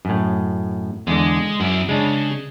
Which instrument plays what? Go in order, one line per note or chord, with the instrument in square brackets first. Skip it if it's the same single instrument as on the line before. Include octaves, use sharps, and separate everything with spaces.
[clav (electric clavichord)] F#2 A2
[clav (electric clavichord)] E2 D3 [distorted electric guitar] G#3
[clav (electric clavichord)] F#2 [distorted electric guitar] E4 D5
[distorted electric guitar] C#3 [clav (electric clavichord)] G#3 D4